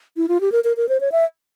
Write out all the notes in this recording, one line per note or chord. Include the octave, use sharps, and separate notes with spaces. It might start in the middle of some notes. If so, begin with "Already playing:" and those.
E4
F4
G4
A#4
A#4
A#4
C5
C#5
E5